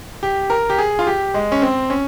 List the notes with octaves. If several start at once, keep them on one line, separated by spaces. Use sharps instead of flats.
G4
A#4
G4
G#4
F4
G4
G#3
C#4
C4
C#4